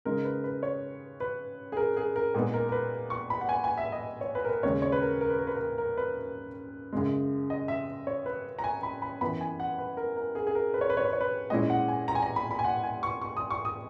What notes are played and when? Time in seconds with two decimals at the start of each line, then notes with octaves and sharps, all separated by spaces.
0.05 C#3 G#3 D#4 A#4
0.24 B4
0.44 B4
0.63 C#5
1.20 B4
1.72 G#4
1.77 A#4
1.97 G#4
2.16 A#4
2.35 A#2 G#3 B3 D#4 G#4
2.54 A#4
2.69 A#4
2.72 B4
3.10 C#6
3.30 B5
3.41 F#5
3.49 G#5
3.64 G#5
3.78 E5
3.92 D#5
4.21 C#5
4.35 B4
4.45 A#4
4.49 B4
4.63 D#2 C#3 G#3 C#5
4.82 C#5
4.92 B4
5.02 A#4
5.21 A#4
5.30 B4
5.39 A#4
5.47 B4
5.56 A#4
5.78 A#4
5.97 B4
6.93 F#2 C#3 G#3
7.50 D#5
7.68 E5
8.07 C#5
8.26 B4
8.59 A#5
8.64 G#5
8.83 B5
9.02 B5
9.21 F#2 E3 B3 B5
9.41 G#5
9.60 F#5
9.78 B4
9.97 A#4
10.17 A#4
10.35 G#4
10.47 G#4
10.55 A#4
10.74 B4
10.81 C#5
10.90 B4
10.97 C#5
11.05 B4
11.13 C#5
11.21 B4
11.50 A#2 G#3 C#4 E4 D#5
11.70 F#5
11.88 G#5
12.08 A#5
12.15 G#5
12.22 A#5
12.36 B5
12.51 B5
12.59 G#5
12.64 F#5
12.84 G#5
13.03 C#6
13.22 C#6
13.37 D#6
13.50 C#6
13.65 D#6